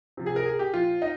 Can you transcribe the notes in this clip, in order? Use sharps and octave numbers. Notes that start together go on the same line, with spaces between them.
C3 F3
G#4
A#4
G#4
G4
A#2 F3 F4
D#4